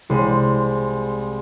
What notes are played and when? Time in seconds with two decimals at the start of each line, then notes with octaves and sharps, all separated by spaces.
0.10 C2 G#3